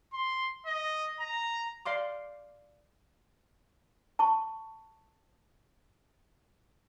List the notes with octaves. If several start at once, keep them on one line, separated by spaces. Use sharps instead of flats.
C6
D#5
A#5
D5 F5 C6 D6
A5 C#6